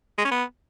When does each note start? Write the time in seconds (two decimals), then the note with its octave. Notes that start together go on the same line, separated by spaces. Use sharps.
0.18 G#3
0.25 C#4
0.31 B3